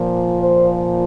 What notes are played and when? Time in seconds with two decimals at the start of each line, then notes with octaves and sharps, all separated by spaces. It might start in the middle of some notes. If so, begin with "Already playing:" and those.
Already playing: A#2 F3
0.40 C5